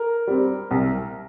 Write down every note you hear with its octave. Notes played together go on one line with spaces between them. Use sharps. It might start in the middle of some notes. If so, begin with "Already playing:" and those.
Already playing: A#4
G3 C4
C2